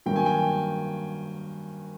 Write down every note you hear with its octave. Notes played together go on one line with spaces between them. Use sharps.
G2 D#3 F#3 A#3 G5
G#5
G5